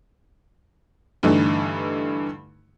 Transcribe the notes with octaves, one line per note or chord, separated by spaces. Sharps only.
G2 D3 E3 A3 D#4